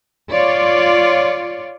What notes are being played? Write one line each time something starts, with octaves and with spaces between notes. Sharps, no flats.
F4 C#5 D5